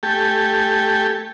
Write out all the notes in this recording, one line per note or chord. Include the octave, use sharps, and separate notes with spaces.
A3 G4 A4 G5 G#5